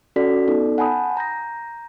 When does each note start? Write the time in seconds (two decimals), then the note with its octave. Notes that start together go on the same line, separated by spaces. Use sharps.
0.16 C#4 F#4 A4 D5 B6
0.48 B3 D#4 A4 D5
0.78 F#5 G#5 A5 B5 D#6 G6
1.17 A#5 G6 A#6